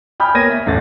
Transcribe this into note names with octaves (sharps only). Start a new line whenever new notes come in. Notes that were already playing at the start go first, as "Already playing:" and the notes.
G5 G#5 B5 D#6 F6 G6
A#3 B3 C#5 G#6 A#6 D#7
E5 B6
A1 E2 A4 A6